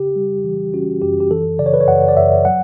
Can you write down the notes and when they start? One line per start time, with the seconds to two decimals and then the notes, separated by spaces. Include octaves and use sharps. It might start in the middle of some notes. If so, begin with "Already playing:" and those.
Already playing: C#3 G4
0.16 G3
0.44 E3
0.73 C#4 F#4
1.02 F#2 G4
1.20 G4
1.31 E3 A4
1.59 C#3 D5
1.66 C#5
1.74 B4
1.81 C#5
1.88 F#2 F#5
2.08 D5
2.17 F#2 E5
2.45 F#3 F#5